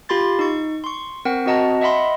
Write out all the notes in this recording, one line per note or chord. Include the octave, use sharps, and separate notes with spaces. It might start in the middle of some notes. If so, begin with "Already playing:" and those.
F4 G4 B5 C6 A6
D#4 C#6
C6 C#6
C4 A#4 F#5 G5
C4 F#4 D#5 F#5 A5 A#5
D#5 E5 F#5 B5 C6